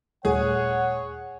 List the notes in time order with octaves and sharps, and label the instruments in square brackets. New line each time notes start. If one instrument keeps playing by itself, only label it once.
[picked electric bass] D#1 G3 A3 [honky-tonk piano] G#4 [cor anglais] C#5 [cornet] F#5